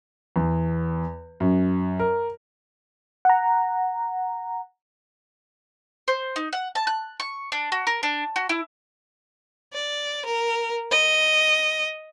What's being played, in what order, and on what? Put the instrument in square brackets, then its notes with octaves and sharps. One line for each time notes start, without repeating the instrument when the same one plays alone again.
[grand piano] E2
F#2
A#4
[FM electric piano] F#5 A#5
[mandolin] C5
D#4
F#5
A5
F#6
C#6
D4
F#4
A#4
D4
F#4
E4
[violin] D5
A#4
D#5